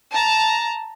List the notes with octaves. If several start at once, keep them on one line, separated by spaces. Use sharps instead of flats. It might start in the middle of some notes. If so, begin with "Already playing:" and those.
A5 A#5